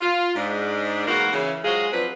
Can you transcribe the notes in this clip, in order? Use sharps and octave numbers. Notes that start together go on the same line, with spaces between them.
F4
G#2 D4
E2 G#2 A#3 F#4
C#3 E3
F#3 G#3 F4 F#4 G#4 C5
F3 F#3 C4 D4 B4